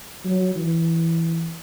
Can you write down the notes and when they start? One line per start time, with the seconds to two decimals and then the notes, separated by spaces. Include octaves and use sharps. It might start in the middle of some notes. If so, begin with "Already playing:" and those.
0.25 F#3
0.55 E3